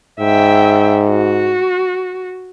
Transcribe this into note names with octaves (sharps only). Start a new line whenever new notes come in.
G#2 E5 G5
F#4